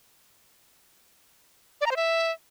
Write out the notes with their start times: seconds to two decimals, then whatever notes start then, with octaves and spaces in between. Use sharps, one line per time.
1.81 D5
1.86 A#5
1.91 C5
1.96 E5